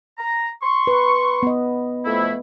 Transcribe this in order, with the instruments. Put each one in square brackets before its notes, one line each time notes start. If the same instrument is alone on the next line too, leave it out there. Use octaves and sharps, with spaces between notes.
[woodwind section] A#5
C6 C#6
[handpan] B4
B3 D#5
[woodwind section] F2 A3 E4